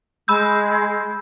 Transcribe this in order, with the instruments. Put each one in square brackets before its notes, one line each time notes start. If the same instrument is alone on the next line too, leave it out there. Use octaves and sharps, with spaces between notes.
[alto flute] G#3 [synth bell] B5 E6 G6